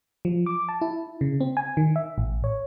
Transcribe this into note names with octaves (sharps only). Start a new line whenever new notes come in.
F3
D6
A5
E4
C#3
C4
G#5
D#3
E5
A1
C#5